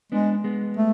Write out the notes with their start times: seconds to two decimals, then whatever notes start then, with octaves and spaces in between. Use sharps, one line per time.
0.12 G#3 B3 D4
0.44 G#3 B3
0.77 A3